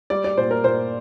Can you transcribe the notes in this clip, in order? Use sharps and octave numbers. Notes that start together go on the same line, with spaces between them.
G3 D5
D5
A#2 C5
A#4
A#2 C5